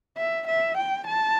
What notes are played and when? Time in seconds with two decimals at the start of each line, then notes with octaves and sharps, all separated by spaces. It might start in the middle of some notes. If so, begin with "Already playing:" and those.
0.17 E5
0.47 E5
0.77 G5
1.07 A5